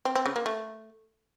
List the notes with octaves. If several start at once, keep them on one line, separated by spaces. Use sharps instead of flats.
C4
C4
C#3
A#3
A3